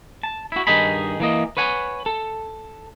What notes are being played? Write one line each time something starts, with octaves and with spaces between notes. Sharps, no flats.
A5
E4 F#4
G2 D#3 D#4 G#4 B5
E3 A#3 D#5
B4 C#5 F#5 G#5
A4